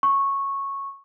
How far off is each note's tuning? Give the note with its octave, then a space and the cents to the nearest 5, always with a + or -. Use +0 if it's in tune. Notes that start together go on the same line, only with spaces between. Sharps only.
C#6 -10